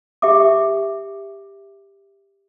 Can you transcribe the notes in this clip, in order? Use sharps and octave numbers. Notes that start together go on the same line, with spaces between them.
G4 E5 D6